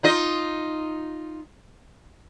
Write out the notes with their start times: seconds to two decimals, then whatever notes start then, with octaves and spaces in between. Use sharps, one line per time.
0.03 D#4 F4 D#5